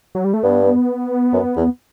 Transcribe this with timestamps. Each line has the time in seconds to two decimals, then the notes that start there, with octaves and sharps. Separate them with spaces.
0.15 F#3
0.24 G3
0.34 A3
0.43 G2 B3
1.33 F#2
1.56 E2